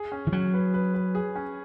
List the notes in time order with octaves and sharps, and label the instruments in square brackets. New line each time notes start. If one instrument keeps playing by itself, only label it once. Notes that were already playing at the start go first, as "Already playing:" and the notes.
Already playing: [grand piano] G#4
C#4
[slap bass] E3
[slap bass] F#3 [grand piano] C#4
[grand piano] B4
B4
B4
G#4
C#4